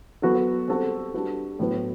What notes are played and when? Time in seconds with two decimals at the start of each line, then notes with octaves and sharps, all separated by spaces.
0.22 F#3 B3 F#4 A4
0.68 G3 C4 F#4 A4
1.14 G3 D4 F#4 B4
1.59 A2 F#3 B3 E4 B4